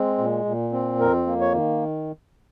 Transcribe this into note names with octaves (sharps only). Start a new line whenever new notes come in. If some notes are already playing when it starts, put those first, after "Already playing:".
Already playing: G#3 C4
A#2
A#2
C4
F2 A#4
A#3
C#5
D#3